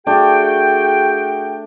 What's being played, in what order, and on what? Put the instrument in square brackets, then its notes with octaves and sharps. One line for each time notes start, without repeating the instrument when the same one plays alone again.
[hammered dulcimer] A3 D4 [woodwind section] F#4 G#4 G5